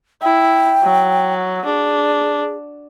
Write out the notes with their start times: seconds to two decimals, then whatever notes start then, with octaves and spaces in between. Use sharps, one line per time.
0.22 E4 G5
0.83 F#3
1.65 D4 G#4